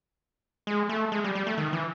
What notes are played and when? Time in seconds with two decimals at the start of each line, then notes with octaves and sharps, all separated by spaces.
0.67 G#3
0.89 A3
1.12 G#3
1.24 G3
1.35 G3
1.47 A3
1.58 D#3
1.73 E3